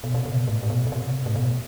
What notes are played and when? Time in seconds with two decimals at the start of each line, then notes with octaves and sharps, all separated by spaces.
0.04 B2
0.14 C3
0.26 B2
0.48 A2
0.63 A2
0.70 B2
0.87 B2
0.92 C3
1.26 A2
1.36 B2